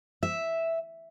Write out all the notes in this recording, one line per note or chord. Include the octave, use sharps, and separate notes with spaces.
E5